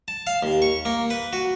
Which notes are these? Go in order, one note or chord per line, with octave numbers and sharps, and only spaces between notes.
A5
F5
D#2
C#6
A#3
B4
F#4